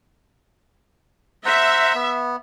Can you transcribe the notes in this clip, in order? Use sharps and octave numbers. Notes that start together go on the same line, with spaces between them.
C5 E5 F#5 A#5
B3